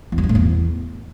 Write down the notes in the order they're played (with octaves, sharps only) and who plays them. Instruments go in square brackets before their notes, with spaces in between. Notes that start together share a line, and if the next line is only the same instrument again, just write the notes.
[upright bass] E2
F#3
G2
A2
E2